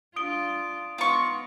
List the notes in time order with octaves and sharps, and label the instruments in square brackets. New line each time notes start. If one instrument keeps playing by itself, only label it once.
[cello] D4 F4 [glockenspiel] D#6 D7 G7
[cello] B3 D#4 [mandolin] F4 C#6